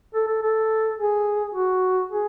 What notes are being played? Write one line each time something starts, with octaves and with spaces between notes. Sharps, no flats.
A4
A4
A4
G#4
F#4
G#4